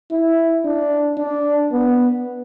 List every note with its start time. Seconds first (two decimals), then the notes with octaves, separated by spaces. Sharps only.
0.11 E4
0.65 D4
1.17 D4
1.72 B3